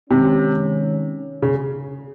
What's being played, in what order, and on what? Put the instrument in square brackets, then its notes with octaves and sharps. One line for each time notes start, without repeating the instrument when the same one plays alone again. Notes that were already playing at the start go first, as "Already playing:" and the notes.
[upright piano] C3 [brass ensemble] D#3 G#3 C#4
[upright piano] C#3